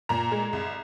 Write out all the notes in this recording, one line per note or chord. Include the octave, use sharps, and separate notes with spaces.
A#2 A#5
G#3
C2